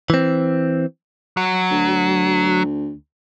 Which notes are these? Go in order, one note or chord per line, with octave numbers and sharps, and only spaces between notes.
E3 C4
F#3
D2